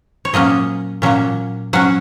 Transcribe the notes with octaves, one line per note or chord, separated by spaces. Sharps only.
C#5
A#2 F#3 A#3 C#4 D#5
A#2 F#3 A#3 C#4
F#3 C#4 F#5